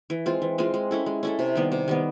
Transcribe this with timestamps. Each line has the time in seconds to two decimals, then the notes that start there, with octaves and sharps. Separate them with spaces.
0.10 E3
0.26 G#3 C4 F4
0.42 E3
0.58 G#3 C4 F4
0.74 G#3
0.91 C#4 E4 A4
1.06 G#3
1.23 C#4 E4 A4
1.39 C3
1.55 D#3 G3 B3
1.72 C3
1.88 D#3 G3 B3